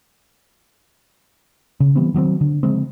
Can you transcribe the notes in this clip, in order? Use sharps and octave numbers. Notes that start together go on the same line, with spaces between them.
C#3
E3 G3 B3 C4
D#3 F#3 G#3 C4
D3
C#3 F3 G#3 C4